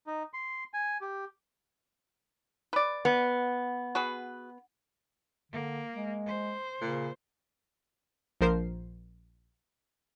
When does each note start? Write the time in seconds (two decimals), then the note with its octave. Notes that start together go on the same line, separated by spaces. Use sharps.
0.07 D#4
0.33 C6
0.74 G#5
1.01 G4
2.73 B4 D5
3.05 B3
3.95 F#4 G#4 B4
5.52 D3 A#3
5.93 G#3
6.26 C5
6.81 A#2 C#3
8.41 A#1 F3 A#4 C5 C7